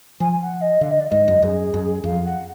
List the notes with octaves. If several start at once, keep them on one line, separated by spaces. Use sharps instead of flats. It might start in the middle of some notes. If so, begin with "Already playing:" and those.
F3 G#5
G#5
F#5
D#5
D3 F5
D#5
D5
G#2 D#5
F#2
F#2 G#4
F#2
F2 F5
F#5